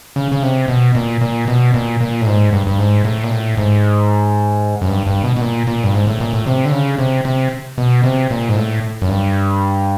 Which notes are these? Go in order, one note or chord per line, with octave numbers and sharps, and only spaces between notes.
C#3
C#3
C3
B2
A#2
A#2
B2
A#2
A#2
A2
G#2
G2
G2
G#2
A2
A#2
A2
G#2
F#2
G2
G2
B2
B2
A#2
A#2
G2
G#2
A2
A#2
A2
C3
D3
C#3
C3
C3
B2
C3
A#2
G#2
A2
F#2
G2